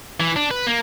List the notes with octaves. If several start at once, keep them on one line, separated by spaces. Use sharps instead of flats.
E3
D4
B4
A#3